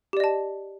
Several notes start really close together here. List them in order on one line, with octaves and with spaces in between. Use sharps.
G4 D5 D#5 A5